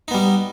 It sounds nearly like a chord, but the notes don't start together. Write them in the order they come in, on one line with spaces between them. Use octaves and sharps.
D#4 B3 G3